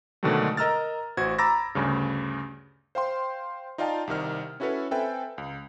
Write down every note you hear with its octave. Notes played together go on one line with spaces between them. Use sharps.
B2 D3 D#3 F#3 G#3 A3
A#4 D#5 A#5 E6 F6 A6
A1 F#4 C5 G#6
A#5 B5 D6 E6 A6 A#6
D2 G2 C#3
C5 F5 G5 C6
D#4 F4 D5 F5 G5 A5
C2 C3 D#3 F6
C#4 E4 F#4 A4 B4 C#5
C4 A4 B4 E5 G5 G#5
C#2